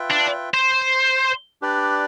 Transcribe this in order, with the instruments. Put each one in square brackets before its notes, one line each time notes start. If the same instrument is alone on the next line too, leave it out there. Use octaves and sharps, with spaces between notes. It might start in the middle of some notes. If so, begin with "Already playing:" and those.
Already playing: [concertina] F4 B4 E5 G5
[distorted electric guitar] D4
C5
[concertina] D4 G4 B4 D5